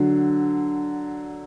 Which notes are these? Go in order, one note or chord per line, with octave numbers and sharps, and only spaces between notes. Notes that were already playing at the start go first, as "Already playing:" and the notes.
Already playing: D3 F#3